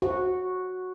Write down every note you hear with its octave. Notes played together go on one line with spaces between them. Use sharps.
F#4